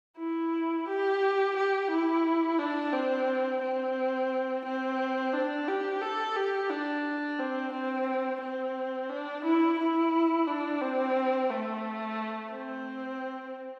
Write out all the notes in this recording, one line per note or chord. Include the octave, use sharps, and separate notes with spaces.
E4
G4
G4
E4
D4
C4
C4
C4
D4
G4
A4
G4
D4
C4
C4
C4
D4
E4
E4
D4
C4
A3
C4